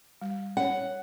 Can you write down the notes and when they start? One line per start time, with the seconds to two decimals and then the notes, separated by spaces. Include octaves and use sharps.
0.21 G3
0.57 C#4 C#5 F#5